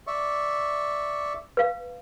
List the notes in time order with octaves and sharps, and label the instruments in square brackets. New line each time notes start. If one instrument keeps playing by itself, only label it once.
[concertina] D5 E5 C#6
[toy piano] B4 F5